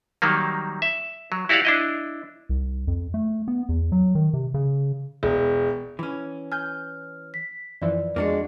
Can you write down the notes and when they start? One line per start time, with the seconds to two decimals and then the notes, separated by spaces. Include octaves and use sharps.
0.22 D#3 F#3 G3 A#3
0.82 E5
1.32 F#3
1.49 E4 F#4 G4 D5 F5 F#5
1.65 D4 E4 D#5
2.49 C2
2.87 F2
3.14 A3
3.48 B3
3.69 E2
3.92 F#3
4.15 D#3
4.33 C3
4.54 C#3
5.23 E1
5.99 E3 C#4
6.52 G#5 F6 G6
7.34 B6
7.82 F#2 E3 F3 D5
8.16 F2 G#3 A#3 D4 F#4